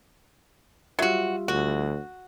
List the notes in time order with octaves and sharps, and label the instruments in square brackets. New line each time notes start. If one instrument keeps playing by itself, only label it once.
[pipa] F#3 F#4 [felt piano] G3 F4 E5
[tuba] D2 [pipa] F#4